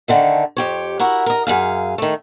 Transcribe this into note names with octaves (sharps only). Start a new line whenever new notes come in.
D3 D#3 A3
F2 G4 C#5
E4 F#4 A#4
A#4 D#5
F#2 G#4 F5
D#3 A3